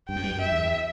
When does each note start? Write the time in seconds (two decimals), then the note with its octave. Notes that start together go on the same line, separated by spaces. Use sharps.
0.09 G2 G5
0.16 F#2
0.23 G2
0.31 F#2
0.41 E5
0.52 E2